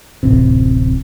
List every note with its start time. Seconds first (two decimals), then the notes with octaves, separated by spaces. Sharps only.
0.23 D1 A1 C3